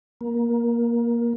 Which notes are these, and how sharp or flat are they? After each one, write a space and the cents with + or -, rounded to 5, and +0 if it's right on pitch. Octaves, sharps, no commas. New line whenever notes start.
A#3 +15